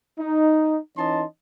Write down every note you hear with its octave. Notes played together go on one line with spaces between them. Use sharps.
D#4
E3 C#4 D#4 D#5 A5 C6